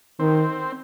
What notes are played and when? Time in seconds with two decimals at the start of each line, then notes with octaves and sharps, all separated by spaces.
0.19 D#3 C4